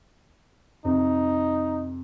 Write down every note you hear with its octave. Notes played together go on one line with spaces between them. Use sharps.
F2 C3 D#4